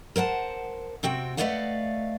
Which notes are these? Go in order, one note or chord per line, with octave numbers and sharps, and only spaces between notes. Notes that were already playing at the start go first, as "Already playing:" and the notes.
A#4 C5 F#5 A5
C3 C4 F#4 G5
A3 B4 D5 D#5 F5 F#5